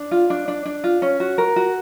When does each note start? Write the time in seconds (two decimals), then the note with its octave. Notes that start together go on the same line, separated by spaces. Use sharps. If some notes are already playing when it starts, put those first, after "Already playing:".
Already playing: D4
0.11 F4
0.30 D4
0.48 D4
0.65 D4
0.84 F4
1.02 C#4
1.20 F#4
1.38 A#4
1.56 F#4